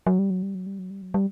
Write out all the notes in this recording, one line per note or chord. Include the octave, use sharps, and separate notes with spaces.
F#3
G3
F#3
G3
F#3
G3
F#3
G3
F#3
G3